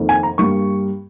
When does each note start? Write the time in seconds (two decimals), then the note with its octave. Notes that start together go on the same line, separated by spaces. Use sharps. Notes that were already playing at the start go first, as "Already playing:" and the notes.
Already playing: F2 D#3 A#3
0.09 G#5
0.23 A#5
0.38 G2 G3 A#3 C#6